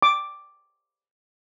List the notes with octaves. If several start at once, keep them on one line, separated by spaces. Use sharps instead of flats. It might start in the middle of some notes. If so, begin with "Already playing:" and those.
D6